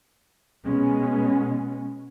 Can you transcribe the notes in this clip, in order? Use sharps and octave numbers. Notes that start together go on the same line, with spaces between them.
B2 G#3 B3 C#4